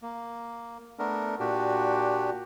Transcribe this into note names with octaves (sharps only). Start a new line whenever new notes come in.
A#3
A3 B3 D4 A#4
A#2 D4 F#4 G4